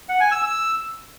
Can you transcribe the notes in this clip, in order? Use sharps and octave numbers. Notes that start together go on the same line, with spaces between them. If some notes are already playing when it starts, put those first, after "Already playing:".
F#5
G#5
E6
E6